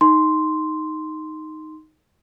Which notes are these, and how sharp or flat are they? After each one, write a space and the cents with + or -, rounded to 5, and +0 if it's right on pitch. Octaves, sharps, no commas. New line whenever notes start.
D#4 +0 C6 -5